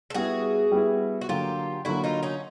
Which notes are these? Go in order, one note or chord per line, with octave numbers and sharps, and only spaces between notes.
A4
G3 B3 E4 F#4 G#4
G3 B3 E4
F#4
D3 F#3 A#3 F4 G4
D3 F#3 A#3 E4 F#4
D#4 F4
C#4 D#4